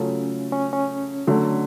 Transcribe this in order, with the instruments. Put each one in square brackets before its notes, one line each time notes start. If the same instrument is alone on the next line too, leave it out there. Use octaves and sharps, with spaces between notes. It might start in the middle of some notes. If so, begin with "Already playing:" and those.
Already playing: [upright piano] C#3 F#3 A3 F4 A4 [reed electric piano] C#4
[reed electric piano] C#4
C#4
[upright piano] D3 F#3 A3